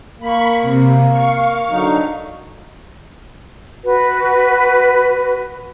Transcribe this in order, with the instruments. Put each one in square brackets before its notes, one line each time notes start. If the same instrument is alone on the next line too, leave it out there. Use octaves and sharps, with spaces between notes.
[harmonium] A#3 [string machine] B5 C#6
[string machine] C3
F5 C#6
[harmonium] D3 F#3 D#4
[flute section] F#4 B4